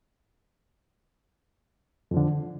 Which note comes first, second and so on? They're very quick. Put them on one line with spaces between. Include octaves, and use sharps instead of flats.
F2 F3 D3